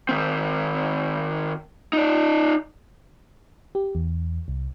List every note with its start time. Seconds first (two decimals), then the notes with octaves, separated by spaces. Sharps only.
0.09 D#3 C4
1.93 D#4 D5
3.75 G4
3.95 E2
4.48 C2